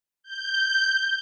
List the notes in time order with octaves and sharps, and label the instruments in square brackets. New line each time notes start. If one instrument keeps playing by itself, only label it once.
[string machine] G6